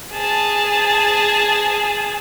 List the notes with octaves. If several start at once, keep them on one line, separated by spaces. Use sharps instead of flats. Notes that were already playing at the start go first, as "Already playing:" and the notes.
G#4 A5